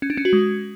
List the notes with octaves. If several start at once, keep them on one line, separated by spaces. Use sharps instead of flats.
C#4
D4
C#4
F#4
G#3